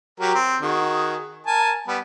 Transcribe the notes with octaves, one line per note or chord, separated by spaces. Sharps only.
F#3 G4 A#4
C4
D#3 F#4 G#4
A#4 G#5 A5
G3 B3